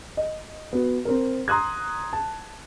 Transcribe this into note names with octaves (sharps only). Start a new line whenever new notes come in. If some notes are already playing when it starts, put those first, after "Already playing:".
D#5
B3 F#4
C4 A#4
A#5 C6 D#6 F#6 G#6
A5